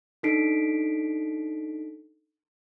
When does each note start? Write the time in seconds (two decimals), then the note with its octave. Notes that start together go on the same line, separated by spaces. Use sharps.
0.23 D4 D#4 A4 B6 C7 D7